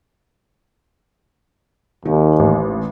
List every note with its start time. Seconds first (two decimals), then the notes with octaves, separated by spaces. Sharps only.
2.05 D#2 D#3
2.40 A1